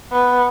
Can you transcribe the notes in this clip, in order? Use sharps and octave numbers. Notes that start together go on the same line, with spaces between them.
B3